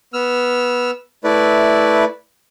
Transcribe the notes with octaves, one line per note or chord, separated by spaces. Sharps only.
B3 E6 F6
A3 E4 B4 D5